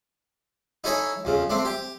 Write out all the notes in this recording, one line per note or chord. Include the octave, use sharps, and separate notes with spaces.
D#4 E4 A4 C#5 G#5
F2 C#3
A3 C4 D4
G4 G5